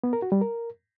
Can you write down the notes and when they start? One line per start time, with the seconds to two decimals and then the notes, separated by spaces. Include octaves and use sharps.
0.04 B3
0.13 A#4
0.22 F#4
0.32 G3
0.41 A#4